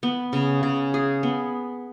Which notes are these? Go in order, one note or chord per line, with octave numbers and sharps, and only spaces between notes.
B3
C#3
C#3
G#4
B3